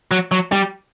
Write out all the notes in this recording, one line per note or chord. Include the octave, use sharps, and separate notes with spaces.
F#3
F#3
G3